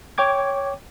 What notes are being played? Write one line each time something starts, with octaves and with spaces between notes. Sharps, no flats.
C#5 G5 D6 G#6